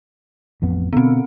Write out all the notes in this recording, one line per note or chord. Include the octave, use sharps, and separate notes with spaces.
A1 F2 B3
B2 D3 B3 C4